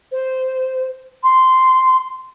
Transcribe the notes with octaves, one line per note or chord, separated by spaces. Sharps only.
C5
C6